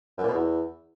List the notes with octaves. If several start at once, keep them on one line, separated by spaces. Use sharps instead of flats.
F#2
A#2
B2
E2